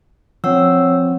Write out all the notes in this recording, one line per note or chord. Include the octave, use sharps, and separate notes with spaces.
F3 C4 C#5 F#5 E6